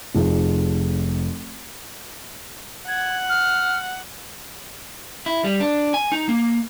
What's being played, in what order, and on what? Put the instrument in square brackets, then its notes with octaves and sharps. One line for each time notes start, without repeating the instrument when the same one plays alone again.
[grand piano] F1 F3 D#4 G#4
[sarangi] F#5 [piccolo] G#6
[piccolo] F6
[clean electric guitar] E4
G3
D4
G#5
D#4
A#3